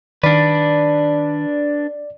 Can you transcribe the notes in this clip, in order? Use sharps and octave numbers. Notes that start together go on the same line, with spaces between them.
D#3 D4 B4 D5